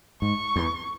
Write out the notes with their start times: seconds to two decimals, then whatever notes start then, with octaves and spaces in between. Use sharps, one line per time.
0.22 G#2 C#6
0.56 E2